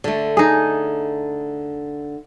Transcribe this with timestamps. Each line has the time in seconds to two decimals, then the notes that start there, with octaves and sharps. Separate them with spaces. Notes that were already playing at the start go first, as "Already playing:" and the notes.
0.04 D3 A3
0.37 D#4 G#4